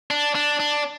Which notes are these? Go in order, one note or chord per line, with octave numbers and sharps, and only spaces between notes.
D4
D4
D4